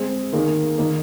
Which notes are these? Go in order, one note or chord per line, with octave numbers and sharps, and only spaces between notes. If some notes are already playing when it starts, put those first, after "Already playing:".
Already playing: G#3 C4 G#4
D#3 A#3 G#4
D#3 A#3 D#4